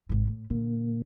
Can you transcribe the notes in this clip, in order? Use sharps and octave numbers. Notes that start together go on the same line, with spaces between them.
G#1 G#2
A2
A#2 D3 A#3